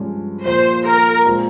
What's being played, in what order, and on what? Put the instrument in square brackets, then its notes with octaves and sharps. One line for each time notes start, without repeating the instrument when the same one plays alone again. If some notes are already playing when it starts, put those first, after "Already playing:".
Already playing: [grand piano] G2 F3 G#3 C#4
[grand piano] A#2 F3 A#3 [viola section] C5
[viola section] A#4
[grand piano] A#2 G#3 C4